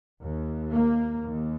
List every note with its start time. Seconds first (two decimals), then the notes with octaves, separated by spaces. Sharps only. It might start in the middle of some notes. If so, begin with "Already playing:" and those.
0.22 D#2
0.72 A#3
1.23 D#2